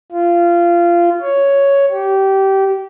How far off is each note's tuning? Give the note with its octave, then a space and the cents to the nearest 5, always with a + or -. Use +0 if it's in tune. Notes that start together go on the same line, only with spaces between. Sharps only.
F4 -20
C#5 +5
G4 -20